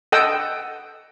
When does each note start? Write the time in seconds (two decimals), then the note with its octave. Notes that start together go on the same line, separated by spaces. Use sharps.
0.12 A4 D#5 F#5 G5 D#6 E6